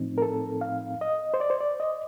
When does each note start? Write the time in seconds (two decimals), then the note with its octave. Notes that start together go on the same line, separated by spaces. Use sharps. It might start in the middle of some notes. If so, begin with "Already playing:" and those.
Already playing: A2 F3 C4 D#4
0.18 A#4
0.22 A4
0.61 F5
1.01 D#5
1.34 C5
1.40 D5
1.50 C5
1.60 D5
1.80 D#5